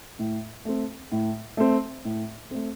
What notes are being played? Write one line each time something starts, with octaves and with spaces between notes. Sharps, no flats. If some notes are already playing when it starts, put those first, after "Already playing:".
A2
A3 C4
A2
A3 C4
A2
A3 C4